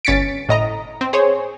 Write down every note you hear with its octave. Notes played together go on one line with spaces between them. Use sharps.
G1 C#4 A6 B6 C#7 D7
A2 D#5 A#5
C4
G#4 C5 C#5